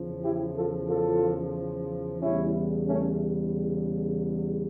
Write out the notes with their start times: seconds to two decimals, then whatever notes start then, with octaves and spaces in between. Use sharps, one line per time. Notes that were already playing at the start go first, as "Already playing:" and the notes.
Already playing: E2 C#3 F3
0.22 E4 G4
0.56 F4 A4
0.89 F4 A4
2.21 E2 C#3 G3 C#4 E4
2.87 A3 C#4